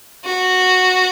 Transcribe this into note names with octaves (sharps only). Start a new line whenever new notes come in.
F#4